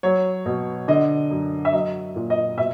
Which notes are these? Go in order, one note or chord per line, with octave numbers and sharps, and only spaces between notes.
F#3 C#5
B2
D3 D#5
F#2
E5
F#3 D#5
A#2
D#5
B2 E5